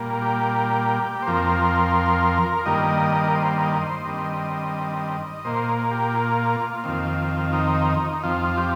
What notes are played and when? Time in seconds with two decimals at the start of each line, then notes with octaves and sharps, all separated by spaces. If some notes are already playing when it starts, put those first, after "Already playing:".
Already playing: A#2 G3 A#3
0.22 G4
1.22 C5
1.27 F2 F3 C4 A#4
2.66 G2 D#3 G3 A#3 D#5
3.24 A#4
3.35 C5
3.59 D#5
3.82 C5
4.05 G2 D#3 G3 C4 D#5
5.45 A#2 A#3 C5
5.91 G4
6.14 F4
6.84 F2 D#3 C4
7.53 D#4
8.13 D#4
8.23 F2 F3 C4 F4
8.57 G4